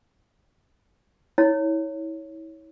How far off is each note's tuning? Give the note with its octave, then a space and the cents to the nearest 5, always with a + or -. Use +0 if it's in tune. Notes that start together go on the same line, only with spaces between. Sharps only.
E4 -35 C#5 +0